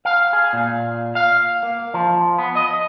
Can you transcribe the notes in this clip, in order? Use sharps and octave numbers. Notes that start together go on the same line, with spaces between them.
F5
G#4
A#2
F5
A#3
F3
B3
D#5